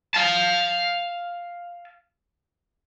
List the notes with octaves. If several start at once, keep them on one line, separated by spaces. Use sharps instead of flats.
F5 A5